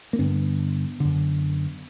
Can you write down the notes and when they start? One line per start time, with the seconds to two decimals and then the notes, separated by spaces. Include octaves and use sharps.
0.13 A#3
0.19 G2 D3 B3
1.00 F#2 D3